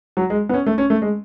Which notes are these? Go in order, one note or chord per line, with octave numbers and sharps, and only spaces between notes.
F#3
G#3
B3
C#4
A3
C#4
A3
G#3